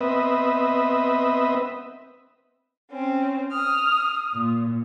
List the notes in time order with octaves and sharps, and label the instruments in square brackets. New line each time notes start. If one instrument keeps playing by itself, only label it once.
[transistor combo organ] B3 C4 B4 D#5 E5
[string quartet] C4 C#4
[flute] D#6 [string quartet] F6
[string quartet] A#2